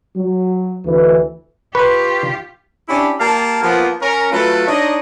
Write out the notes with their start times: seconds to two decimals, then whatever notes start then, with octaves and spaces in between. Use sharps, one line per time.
0.17 F#3
0.85 D2 E3
1.75 F4 G4 B4 C6 C#6
2.88 C#4 D4 E4 G4 A5 B5
3.19 A#3 G4 F5 A5
3.62 F3 A#3 B3
4.01 C#4 A#4
4.32 F#3 A3 F4 A4 B4
4.67 D4 D#4 C#5 D#5